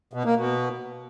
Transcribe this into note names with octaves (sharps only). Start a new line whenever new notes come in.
B2
A#3
B2